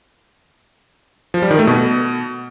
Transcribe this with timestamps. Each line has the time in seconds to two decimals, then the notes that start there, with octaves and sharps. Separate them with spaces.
1.34 F3
1.42 G3
1.51 D#3
1.59 A3
1.67 B2